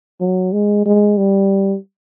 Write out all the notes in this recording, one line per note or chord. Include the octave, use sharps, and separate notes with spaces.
F#3
G#3
G#3
G3